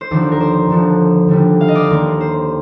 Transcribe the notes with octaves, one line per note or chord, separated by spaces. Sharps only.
C5
D#2 D3 F3 D5
A#4
C5
D#2 D3 F3
D#2 D3 G3 A#3
F5
D#5
D5
C5
D#2 D3 G3 A#3 A#4
C5